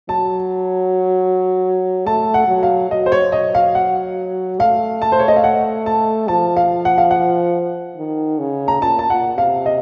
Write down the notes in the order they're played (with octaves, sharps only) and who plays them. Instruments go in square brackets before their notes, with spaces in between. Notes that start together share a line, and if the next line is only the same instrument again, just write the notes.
[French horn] F#3 [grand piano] A5
[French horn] A3 [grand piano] A5
[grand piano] F#5
[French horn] F#3
[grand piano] F5
[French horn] F#3 [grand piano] D#5
[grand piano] C5
C#5
D#5
F5
F#5
[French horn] A3 [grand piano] F5
[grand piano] A5
C5
C#5
D#5
F5
F#5
A5
[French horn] F3 [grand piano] A5
[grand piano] F5
F#5
F5
F#5
[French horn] D#3
C#3
[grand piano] A#5
[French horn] A#2 [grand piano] A5
[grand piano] A5
[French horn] A#2 [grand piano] F#5
[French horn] C3 [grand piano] F5
[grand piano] D#5